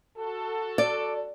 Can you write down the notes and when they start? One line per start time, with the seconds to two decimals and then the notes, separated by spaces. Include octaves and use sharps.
0.17 F#4 A4
0.78 D5